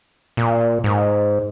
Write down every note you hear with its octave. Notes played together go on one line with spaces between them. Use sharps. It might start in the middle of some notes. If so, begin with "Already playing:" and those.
A#2
G#2